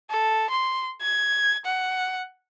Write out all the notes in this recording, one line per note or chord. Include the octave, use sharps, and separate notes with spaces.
A4
C6
G#6
F#5